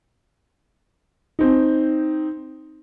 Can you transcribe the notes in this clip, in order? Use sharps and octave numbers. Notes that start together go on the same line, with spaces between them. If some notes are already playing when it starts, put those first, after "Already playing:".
C4 D#4